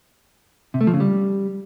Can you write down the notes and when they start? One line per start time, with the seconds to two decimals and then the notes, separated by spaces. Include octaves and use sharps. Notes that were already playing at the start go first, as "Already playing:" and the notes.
0.74 C3
0.81 A3
0.87 F3
0.94 C#3
1.00 G3